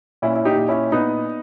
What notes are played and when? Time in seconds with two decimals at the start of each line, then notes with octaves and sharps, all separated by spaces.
0.22 A#2 C#4 E4
0.36 E4
0.45 D#4 G4
0.57 A#2
0.69 C#4 E4
0.92 A#2 B3 D#4